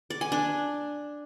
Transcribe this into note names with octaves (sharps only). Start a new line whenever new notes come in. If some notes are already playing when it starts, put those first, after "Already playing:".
D5
G#5
D4